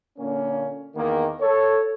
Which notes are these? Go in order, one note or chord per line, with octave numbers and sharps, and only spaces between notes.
A#2 D3 A#3 C#4
E2 D#3 A#3
A4 C#5